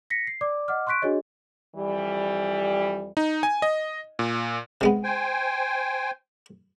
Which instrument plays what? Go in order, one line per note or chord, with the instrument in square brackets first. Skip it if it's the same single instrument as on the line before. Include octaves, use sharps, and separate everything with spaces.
[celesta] A#6 B6 C#7
C7
D5 D6
D#5 F#5 D6 F6
C6 C#6 F#6 B6 D7
D4 F#4 G#4 C#5 D#5
[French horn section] F2 E3 G3
[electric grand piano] D#4
G#5
D#5
A#2
[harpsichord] C3 G#3 B3
[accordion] C5 G5 G#5